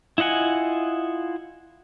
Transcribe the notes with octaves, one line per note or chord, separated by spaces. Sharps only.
E4 F4 D#5 F#5 G#5